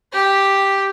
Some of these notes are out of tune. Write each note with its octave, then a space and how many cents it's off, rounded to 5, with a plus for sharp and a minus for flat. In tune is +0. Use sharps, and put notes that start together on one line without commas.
G4 +0 G5 +0